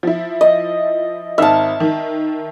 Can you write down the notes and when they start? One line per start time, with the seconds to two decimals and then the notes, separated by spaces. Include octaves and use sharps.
0.03 F3 E4
0.41 D#5
1.38 G#1 D#4 E5 A5 F6
1.80 D#3